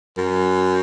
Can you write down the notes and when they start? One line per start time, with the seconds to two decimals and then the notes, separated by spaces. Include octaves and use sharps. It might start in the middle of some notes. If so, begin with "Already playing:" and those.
0.18 F#2